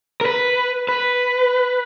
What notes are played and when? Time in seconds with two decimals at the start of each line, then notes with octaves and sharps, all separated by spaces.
0.21 A#4
0.25 B4
0.89 B4